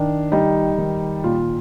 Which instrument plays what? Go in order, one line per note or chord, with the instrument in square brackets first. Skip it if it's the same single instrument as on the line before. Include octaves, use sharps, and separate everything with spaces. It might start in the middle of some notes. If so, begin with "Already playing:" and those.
Already playing: [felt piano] D#3 D4
G3 D#4
D#3
A#2 F4